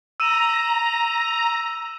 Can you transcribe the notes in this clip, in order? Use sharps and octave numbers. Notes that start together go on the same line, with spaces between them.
A#5 E6 D#7 E7